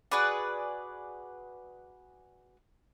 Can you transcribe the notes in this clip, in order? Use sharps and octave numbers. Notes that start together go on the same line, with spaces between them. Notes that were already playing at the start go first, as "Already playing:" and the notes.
F#4 G#4 B4 D5